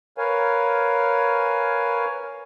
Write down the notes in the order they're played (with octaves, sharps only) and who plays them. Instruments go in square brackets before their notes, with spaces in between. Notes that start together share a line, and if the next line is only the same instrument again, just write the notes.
[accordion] A#4 B4 C#5 F5 G#5